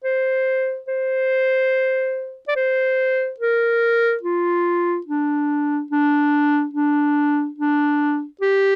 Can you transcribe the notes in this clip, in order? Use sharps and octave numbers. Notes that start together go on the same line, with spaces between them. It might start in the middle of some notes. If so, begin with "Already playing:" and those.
C5
C5
D5
C5
A#4
F4
D4
D4
D4
D4
G4